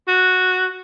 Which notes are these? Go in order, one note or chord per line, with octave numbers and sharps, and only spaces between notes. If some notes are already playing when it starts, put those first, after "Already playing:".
F#4